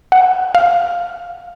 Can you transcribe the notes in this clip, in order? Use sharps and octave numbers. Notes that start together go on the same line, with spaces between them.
F#5
F5